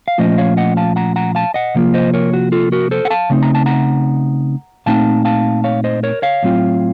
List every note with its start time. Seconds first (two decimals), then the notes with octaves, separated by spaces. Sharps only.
0.08 F5
0.18 A#2 F3 A3 C#4 F4 C5 D#5
0.38 C#5 F5
0.57 D#5 F#5
0.77 F5 A5
0.96 F#5 A#5
1.16 F#5 A#5
1.35 F5 A5
1.54 D#5 F#5
1.75 C3 F3 A#3 F4
1.94 C5 D#5
2.14 A#4 C#5
2.33 F#4
2.52 F4 A4
2.72 F#4 A#4
2.91 A4 C5
3.05 F#5
3.10 F5 A5
3.30 C#3 A3 C4 D#4
3.43 A#5
3.55 A5
3.66 F#5 A#5
4.86 A#2 A3 C4 D#4 F5 A5
5.25 F5 A5
5.64 C#5 F5
5.84 C5 D#5
6.03 A#4 C#5
6.22 C#5 F5
6.43 A2 F#3 C4 F4